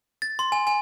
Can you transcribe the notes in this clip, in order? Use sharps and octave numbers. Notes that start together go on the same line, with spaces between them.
A6
C6
G#5
G#5